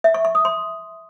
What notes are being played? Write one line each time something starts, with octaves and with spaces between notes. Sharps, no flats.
E5
C#6
C#6
D#6
C6